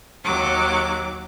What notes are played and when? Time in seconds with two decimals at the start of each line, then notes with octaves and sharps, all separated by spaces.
0.23 D#2 F#3 D6